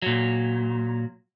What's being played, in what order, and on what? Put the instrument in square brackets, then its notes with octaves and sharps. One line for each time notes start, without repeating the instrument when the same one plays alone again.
[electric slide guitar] A#2 F#3